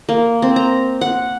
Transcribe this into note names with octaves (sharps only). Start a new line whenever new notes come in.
A#3
C4
A#5
F#5